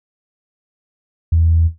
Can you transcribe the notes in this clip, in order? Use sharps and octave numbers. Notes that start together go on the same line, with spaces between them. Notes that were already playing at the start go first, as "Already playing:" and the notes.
E2